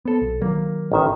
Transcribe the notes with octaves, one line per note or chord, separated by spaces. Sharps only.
B3 C4 A4
B1
D#3 F#3 A#3
A1 D#3 E5